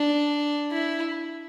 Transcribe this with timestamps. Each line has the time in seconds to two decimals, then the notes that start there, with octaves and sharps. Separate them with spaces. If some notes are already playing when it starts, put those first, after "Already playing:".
Already playing: D4
0.72 E4